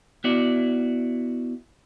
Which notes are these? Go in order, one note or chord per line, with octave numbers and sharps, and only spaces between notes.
B3 E4 F#4 D5